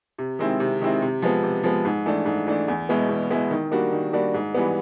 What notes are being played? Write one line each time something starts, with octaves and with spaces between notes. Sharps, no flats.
C3
D#3 G#3 C4 E4
C3
D#3 G#3 C4 E4
C3
F3 G#3 B3
C3
F3 G#3 B3
G#2
E3 A3 D4
G#2
E3 A3 D4
E2
B2 G#3 B3 E4
E2
B2 G#3 B3 E4
D#3
G3 A#3 D4 F#4
D#3
G3 A#3 D4 F#4
G#2
E3 G3 B3